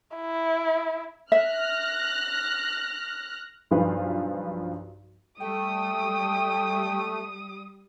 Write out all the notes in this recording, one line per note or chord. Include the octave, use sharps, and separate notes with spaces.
E4
E5 F6 F#6 A#6
B1 G2 F3 B4 F5
G3 A3 G5 D#6